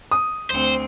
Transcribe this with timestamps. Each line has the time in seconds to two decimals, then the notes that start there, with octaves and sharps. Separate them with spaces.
0.11 D#6
0.50 D2 C4 C5